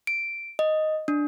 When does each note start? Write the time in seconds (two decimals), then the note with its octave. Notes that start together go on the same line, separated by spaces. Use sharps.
0.07 D7
0.59 D#5
1.08 D4